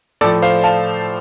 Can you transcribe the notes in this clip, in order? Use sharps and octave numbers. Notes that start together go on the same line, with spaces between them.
A2 F3 A4 D5
C5 F5
F5 A5